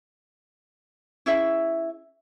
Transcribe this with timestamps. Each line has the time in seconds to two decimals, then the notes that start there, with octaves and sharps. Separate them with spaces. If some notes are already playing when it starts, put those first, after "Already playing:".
1.26 C#4 E4 G#4 E5